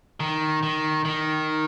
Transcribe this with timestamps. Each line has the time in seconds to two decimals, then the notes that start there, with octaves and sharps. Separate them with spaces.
0.20 D#3
0.63 D#3
1.05 D#3